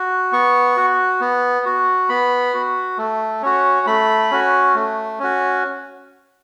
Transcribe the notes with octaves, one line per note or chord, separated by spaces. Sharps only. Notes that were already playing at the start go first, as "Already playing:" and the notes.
Already playing: F#4
B3 C#6
F#4
B3
F#4
B3 B5
F#4
A3
C#4 F#4
A3 B5
C#4 F#4
A3
C#4 F#4